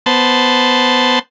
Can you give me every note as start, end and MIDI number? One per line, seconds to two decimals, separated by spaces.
0.06 1.19 59
0.06 1.19 72
0.06 1.19 81